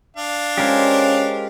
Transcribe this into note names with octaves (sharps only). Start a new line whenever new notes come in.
D4 F5
G#3 C#4 F4 G4 A#4 C5